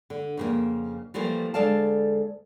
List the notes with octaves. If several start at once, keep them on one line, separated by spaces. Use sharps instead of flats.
D3
F2 C#3 A#3
E3 F3 G3 A3 A#3
D2 G#3 A4 D5 F5 A5